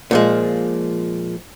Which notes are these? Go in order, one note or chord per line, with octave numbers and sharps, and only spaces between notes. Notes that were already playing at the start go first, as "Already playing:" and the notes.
A#2 F3 G#3